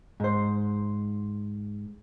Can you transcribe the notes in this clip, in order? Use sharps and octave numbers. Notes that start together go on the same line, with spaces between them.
G#2 C5